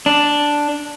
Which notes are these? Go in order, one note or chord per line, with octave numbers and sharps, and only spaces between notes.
D4